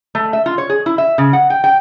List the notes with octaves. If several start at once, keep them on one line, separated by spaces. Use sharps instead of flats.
A3
E5
F4
C#5
G#4
E4
E5
C#3
F#5
G5
G5